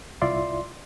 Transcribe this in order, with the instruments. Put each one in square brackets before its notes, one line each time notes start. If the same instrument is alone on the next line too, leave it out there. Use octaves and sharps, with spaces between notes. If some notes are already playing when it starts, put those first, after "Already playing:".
[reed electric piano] C2 E4 F4 D5 E5 C6